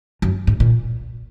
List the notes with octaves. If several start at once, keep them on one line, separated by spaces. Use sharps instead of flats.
F#2
G#2
A#2